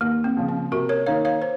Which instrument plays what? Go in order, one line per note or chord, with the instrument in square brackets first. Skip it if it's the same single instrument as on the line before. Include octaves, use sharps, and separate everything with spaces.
[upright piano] D#2 [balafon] A#3
[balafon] C4
[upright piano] C#3 F3
[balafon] C#4
[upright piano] C3 [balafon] F#4 A#4
[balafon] A#4 C#5
[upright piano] D#3 A#3 D#4 [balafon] C#5 F5
[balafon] C#5 F5
C5